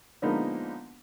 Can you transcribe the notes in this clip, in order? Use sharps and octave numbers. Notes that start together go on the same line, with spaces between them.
D3 F3 G#3 A#3 B3 D#4